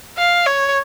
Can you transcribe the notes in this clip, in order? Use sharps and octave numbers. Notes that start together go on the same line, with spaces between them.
F5
C#5